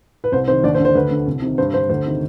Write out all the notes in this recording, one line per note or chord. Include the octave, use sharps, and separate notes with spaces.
B4
C2 C5
C3 D#3 C5
D#2 D4 D5
C5
D3
C5
D2 B4
D3
C2
C3 D#3
G2 C5
D3 C5
D2 C5
C3 D#3